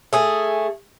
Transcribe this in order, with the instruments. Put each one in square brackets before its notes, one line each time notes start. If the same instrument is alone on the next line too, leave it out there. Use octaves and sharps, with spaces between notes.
[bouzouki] A3 G#4